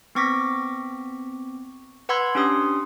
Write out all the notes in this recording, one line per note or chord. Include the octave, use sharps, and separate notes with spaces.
B3 C4 C#6 D6 A#6 B6
B4 F#5 B5 C6 E6 G#6
C#4 D4 G4 C6 D#6